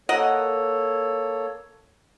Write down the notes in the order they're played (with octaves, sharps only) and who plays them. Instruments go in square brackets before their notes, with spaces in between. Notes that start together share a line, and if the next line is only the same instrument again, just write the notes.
[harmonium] A#3 A4 C#5 [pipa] A#4 D#5 F#5